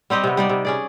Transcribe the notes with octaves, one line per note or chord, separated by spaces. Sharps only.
G3 C4 G4 D#5
C3 B3
G3 D#4 D5
C3
C#4 G#4 D5